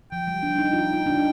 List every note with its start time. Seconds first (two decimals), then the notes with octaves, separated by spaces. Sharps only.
0.12 F3 G5
0.27 G3
0.43 D4
0.59 D#4
0.73 F4
0.93 D#4
1.06 D4
1.14 D#4